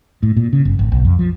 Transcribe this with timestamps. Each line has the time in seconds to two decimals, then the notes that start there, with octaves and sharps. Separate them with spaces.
0.23 A2
0.37 A#2
0.53 C#3
0.65 G1
0.79 G#1
0.92 B1
1.05 F2
1.19 F3